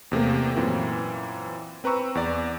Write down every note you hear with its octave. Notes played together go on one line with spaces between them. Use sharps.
E2 C3 A3 A#3
F#2 A#2 E3 C4
C4 B4 A#5 C#6 E6
E2 D5